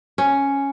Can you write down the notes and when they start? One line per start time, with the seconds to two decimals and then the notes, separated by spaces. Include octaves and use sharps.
0.18 C#4